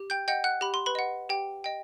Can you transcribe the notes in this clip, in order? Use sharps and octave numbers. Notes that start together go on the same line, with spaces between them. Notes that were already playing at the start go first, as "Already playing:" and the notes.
Already playing: G4
G5 G6
D#5 F#5 G5 G6
F#5 F#6
G4 B5
C6
B4 B5
D#5 F#5
G4 G5
D#5 G5